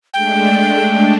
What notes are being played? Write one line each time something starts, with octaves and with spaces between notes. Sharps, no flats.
G#3 A3 D4 G5